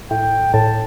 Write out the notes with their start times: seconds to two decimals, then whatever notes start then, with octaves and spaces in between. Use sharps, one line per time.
0.11 A2 G5
0.53 A2 A5